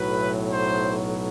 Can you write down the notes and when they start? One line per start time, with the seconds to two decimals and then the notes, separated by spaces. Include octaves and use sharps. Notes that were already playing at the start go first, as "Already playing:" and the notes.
Already playing: B1 A2 F#3 B4
0.50 C5